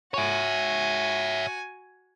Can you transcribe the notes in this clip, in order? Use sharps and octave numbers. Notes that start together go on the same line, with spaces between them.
F#4 C#5 E5 G#5